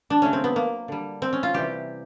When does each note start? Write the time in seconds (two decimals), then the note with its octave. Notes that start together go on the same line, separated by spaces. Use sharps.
0.10 D4
0.22 C#3 F#3 A3 C#4
0.33 C4
0.44 B3
0.56 A#3
0.88 D3 G3
1.22 C4
1.33 C#4
1.43 F4
1.54 C3 E3 G3 G4